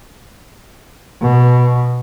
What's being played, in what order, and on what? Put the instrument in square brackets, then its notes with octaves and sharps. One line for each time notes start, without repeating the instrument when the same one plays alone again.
[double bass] B2